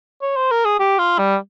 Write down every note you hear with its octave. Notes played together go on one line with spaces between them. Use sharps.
C#5
C5
A#4
G#4
G4
F4
G3